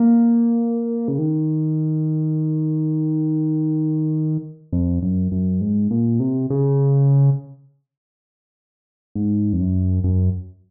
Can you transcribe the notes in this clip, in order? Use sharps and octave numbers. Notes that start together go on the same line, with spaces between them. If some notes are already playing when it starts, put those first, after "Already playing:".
Already playing: A#3
C#3
D#3
F2
F#2
F#2
G#2
A#2
C3
C#3
G#2
F2
F#2
F#2